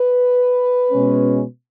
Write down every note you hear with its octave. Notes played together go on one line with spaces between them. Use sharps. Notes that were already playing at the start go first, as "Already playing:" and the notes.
Already playing: B4
B2 G#3 C#4